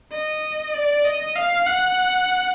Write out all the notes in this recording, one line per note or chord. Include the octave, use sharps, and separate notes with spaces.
D#5
D5
D#5
F5
F#5